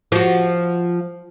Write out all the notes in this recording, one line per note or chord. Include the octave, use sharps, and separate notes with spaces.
F3 F#4